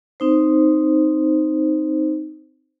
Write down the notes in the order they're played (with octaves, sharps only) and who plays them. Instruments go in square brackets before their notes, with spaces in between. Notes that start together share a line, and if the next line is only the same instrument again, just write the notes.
[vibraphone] C4 D#4 C5